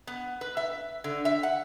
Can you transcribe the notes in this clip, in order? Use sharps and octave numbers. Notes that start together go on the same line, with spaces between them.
B3
B4
E5
D3
E5
F#5